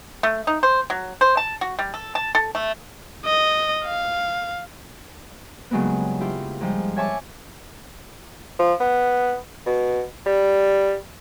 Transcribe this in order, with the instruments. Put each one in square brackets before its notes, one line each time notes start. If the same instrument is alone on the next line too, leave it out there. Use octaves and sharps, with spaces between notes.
[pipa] A3
D#4
C5
F#3
C5
A5
F#4
G3
A4
A5
A4
A3
[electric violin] D#5
F5
[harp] G2 C#3 F#3 G#3 A#3 B3
E4 F4 G4
G#2 F3 G3
C#5 E5 G#5 A5 C#6 D6
[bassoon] F3
B3
B2
G3